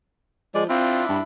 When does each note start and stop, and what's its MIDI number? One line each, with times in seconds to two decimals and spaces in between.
0.55 0.68 53
0.55 0.64 56
0.55 0.64 74
0.69 1.03 60
0.69 1.23 62
0.69 1.23 64
0.69 1.05 65
1.09 1.19 43